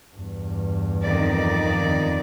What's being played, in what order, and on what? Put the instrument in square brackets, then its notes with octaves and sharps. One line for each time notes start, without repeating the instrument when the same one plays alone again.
[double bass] E2 G2
[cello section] F2 D#3 D5